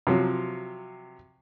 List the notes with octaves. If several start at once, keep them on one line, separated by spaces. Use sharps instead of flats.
C3 F3 F#3